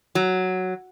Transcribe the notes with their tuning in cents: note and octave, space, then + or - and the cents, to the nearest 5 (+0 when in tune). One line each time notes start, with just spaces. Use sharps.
F#3 +0